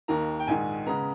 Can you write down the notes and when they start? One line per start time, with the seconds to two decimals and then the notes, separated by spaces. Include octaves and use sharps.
0.08 D#2 D#3 A#3 A#5
0.40 G5
0.47 A#1 G#2 D#3 G#5
0.87 C#3 G#3 B3 A#5